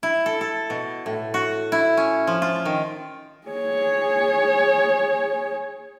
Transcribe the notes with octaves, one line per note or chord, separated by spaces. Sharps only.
E4
A4
A4
B2
A2
F#4
E4
C#4
F3
F4
D#3
G#4 C#5